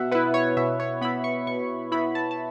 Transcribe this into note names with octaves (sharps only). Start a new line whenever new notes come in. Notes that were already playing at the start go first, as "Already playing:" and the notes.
Already playing: B2 E5 F#5
B3 E4 B4
C#5
B2 E5
C#5
B3 E4 B5
C#6
B2 C#6
B3 E4 B5
A5
A5